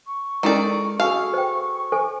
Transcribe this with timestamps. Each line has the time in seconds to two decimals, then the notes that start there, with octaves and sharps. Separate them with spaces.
0.06 C#6
0.43 D#3 G#3 C#4 E4 A4 A#4 D5 A#5
1.00 F#4 G#4 A4 F5 C#6
1.34 C5 G5
1.92 A4 C5 G#5